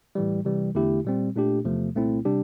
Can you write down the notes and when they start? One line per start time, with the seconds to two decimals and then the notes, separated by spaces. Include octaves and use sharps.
0.15 A2 E3 G3
0.45 C3 E3 G3
0.75 E2 D3 A3 E4 G4
1.05 A#2 G3 C4
1.36 A#2 A3 D4 G4
1.65 E2 C3 F3 A3
1.95 C2 A#2 A3 C4 E4
2.25 C3 G3 D4 G4